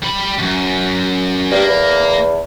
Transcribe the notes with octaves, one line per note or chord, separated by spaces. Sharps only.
G3 B5
C#2 F#2
G2 A#3
E2